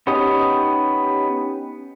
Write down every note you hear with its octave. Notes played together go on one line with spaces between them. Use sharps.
B3 C#4 D#4 G4 D#6